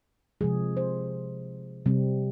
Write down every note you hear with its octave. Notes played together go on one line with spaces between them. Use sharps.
C3 F3 G#3 G#4
C5
C3 G3 C4